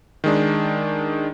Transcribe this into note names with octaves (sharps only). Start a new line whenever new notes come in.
D#3 G#3 D4